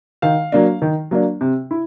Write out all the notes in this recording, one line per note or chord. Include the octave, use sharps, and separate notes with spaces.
D#3 F5
F#3 A#3 D4
D#3
F#3 A#3 D4
C3
E4